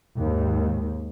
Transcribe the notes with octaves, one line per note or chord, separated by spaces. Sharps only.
D#2 G#2